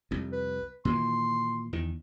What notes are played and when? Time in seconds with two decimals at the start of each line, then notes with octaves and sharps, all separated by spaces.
0.11 C2 F2
0.32 B4
0.85 A#2 D#3 E3 C6
1.73 E2 D#3